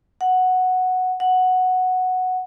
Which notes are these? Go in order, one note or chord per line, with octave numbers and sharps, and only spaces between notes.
F#5
F#5